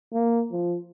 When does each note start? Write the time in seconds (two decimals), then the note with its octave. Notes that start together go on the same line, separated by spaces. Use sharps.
0.13 A#3
0.52 F3